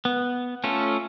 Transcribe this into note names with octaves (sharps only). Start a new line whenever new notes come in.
B3
A3 C#4 F4 A4